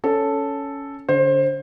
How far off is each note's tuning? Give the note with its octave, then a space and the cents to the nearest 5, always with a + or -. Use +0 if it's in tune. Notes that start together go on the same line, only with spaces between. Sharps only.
C#4 +10 A4 +0
D3 -35 C5 +25